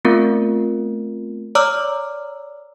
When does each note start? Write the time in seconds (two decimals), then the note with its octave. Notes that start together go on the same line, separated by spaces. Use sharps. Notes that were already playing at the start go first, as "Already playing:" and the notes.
0.05 A3 B3 C4 F4 A#4
1.55 C#5 D5 A#5 D6 E6 F6